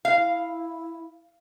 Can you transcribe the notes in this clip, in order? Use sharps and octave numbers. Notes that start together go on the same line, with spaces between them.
E4 F5